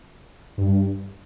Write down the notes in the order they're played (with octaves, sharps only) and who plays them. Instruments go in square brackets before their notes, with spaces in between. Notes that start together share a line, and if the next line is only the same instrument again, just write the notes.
[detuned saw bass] G2